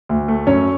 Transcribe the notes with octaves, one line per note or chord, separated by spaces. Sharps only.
D2
A3
F#2 C#4 C#5